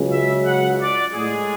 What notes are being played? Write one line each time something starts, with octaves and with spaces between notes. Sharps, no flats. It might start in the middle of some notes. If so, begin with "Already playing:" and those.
Already playing: C#2 C#3 F#3
E5
F#5
D5
A2 G#3 G#4